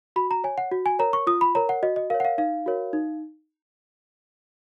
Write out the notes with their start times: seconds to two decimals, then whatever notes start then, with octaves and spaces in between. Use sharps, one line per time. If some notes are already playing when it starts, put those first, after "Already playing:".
0.16 F#4 B5
0.31 A#5
0.44 C#5 G#5
0.58 F#5
0.72 F#4
0.86 G#5
0.99 A#4 C#5 A#5
1.13 C#6
1.27 F4 D#6
1.41 B5
1.55 A#4 C#5 A#5
1.69 F#5
1.83 F#4 D#5
1.96 D#5
2.10 A#4 C#5 F5
2.20 F#5
2.25 F5
2.38 D#4 F5
2.66 F#4 A#4 C#5
2.93 D#4